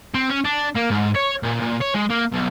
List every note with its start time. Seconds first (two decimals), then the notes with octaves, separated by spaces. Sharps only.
0.14 C4
0.29 C#4
0.44 D4
0.75 A#3
0.90 G#2
1.15 C#5
1.43 A#2
1.60 A#2
1.81 C#5
1.94 G#3
2.10 A#3
2.33 B1